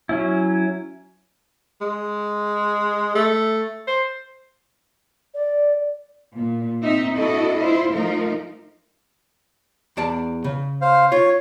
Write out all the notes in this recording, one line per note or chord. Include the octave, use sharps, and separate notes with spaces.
F#3 C#4 E4
G#3
A3
C5
D5
A#2
C4 D#4 E5
D4 E4 F#4 A4 D#5
E4 F4 C5
F3 A3 D#4 A#4
E2 D5 A5
C#3
C5 F5
F4 C#5